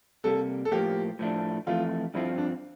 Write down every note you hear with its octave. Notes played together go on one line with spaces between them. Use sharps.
C3 G3 A#3 A4
A4
A2 F3 A#3 G4
A2 F3 A3 D4
F2 E3 A3 F4
G2 F3 C4 E4 F4
D4